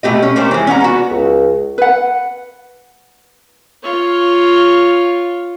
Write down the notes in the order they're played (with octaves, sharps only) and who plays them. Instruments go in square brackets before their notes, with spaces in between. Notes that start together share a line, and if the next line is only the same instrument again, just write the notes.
[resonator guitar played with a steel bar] B2 A3 G4 D#5
C#4
A3 A#3 C#4 G4 C5
E3 G#3
C#4 D4 F#5 A#5
B3 F#4
[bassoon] C#2
[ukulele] B4 F#5
[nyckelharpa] F4 C#5